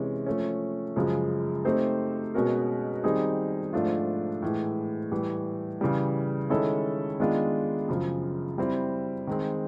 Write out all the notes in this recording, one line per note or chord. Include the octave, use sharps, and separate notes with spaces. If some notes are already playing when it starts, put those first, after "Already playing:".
Already playing: C3 E3 G#3 C#4
F3 A3 C#4
F#2 C#3 F3 G#3
A3 C4 D#4 G4 C5
B2 G#3 C#4 F#4 A#4
D#3 G3 C4 D#4 G#4
G#2 F3 A3 D4 F4
A2 E3 G#3
A2 E3 G3
C#3 E3 G3
D#3 G#3 C#4 E4 A4
D#3 G#3 B3 D4 F4
F#2 C#3 F3
G3 C4 E4
D#3 G#3 C4